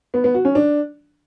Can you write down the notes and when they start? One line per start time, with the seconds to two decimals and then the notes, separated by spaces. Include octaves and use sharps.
0.14 B3
0.24 B3
0.34 F#4
0.45 C#4
0.55 D4